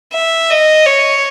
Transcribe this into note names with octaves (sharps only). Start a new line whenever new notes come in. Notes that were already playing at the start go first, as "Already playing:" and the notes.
E5
D#5
C#5